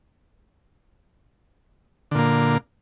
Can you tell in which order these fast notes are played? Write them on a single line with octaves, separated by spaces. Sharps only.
D3 A#2 A#3